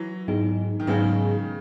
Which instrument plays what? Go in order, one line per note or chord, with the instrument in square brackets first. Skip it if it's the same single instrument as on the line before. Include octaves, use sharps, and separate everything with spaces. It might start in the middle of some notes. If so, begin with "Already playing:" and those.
Already playing: [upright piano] E3 F#3
[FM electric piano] G#2 F#3 B3 D#4 G#4
[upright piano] D#3
[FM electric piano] G#2 F#3 B3 D#4 G#4 [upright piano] C#3